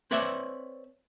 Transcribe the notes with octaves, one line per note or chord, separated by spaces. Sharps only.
C4 B4 C#5 D5 E5